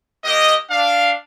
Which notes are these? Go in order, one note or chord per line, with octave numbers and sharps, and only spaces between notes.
A#3 G4 D#5
D4 F5